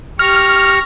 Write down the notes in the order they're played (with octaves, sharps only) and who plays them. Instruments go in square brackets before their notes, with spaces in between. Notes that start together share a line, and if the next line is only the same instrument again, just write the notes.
[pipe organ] G4 C#6 A#6 [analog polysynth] F6